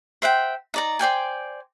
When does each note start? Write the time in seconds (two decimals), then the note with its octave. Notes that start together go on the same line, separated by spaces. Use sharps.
0.22 C5 E5 F#5 G5
0.74 D#4 D5 A#5
0.99 C5 D5 G5 G#5